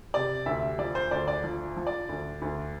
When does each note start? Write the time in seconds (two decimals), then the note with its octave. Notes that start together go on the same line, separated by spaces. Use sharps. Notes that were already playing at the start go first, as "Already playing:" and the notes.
0.14 C3 D5
0.46 D2 E5
0.79 F3 D5
0.95 C5
1.11 D2 D5
1.28 D5
1.44 F3
1.77 F3
1.87 D5
2.09 D2
2.42 D2